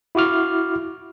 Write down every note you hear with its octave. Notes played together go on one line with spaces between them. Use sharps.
E4 F#4 D6 F6